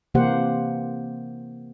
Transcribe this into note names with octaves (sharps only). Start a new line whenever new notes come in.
C3 E3 A#3 G4 C5 F#5